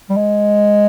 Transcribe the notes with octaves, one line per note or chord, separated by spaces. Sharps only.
G3
G#3